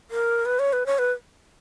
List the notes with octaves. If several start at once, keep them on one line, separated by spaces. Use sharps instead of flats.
A#4
B4
C#5
B4
C#5
B4